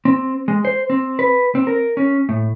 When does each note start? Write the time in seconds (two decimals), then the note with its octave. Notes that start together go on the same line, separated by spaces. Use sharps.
0.05 C4
0.48 G#3
0.65 C5
0.90 C4
1.19 B4
1.55 C4
1.67 A#4
1.97 C#4
2.29 A2